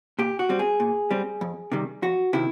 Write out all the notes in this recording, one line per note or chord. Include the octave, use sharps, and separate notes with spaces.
A#2 G4
F#4
G3 C4
G#4
A#2
G3 C4
F2
C3 D#3 G3
F2 F#4
C3 D#3 E4